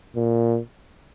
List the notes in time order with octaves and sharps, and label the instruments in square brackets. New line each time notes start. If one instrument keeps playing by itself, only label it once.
[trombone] A#2